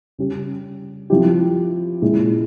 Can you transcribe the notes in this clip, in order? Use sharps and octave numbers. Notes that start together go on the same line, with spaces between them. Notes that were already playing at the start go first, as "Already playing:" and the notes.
C#3 G3 C#4 G4
F3 C4 E4 G4
A#2 G#3 E4 G#4